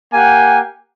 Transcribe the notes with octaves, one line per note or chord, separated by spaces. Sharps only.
A#3 G4 F#5 G#5